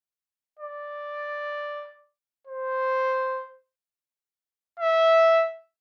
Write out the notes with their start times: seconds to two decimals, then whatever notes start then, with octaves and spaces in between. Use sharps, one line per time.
0.60 D5
2.47 C5
4.80 E5